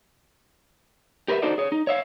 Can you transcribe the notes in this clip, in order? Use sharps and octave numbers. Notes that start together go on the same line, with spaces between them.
G4 A#4 B4 C#5 E5
D4 D#4 F#4 A4 C5 D5
G#4 C#5
D#4
C#5 E5 F5